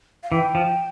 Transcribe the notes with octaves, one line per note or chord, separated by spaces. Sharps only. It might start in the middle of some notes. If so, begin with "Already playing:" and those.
F5
E3 G5
F3